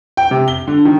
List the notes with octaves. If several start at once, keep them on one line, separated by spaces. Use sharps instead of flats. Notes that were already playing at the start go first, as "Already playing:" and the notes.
G5
C3
G7
D3
D#3